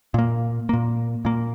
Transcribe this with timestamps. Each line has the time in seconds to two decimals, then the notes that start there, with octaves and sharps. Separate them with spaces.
0.14 A#2 A#3
0.69 A#2 A#3
1.25 A#2 A#3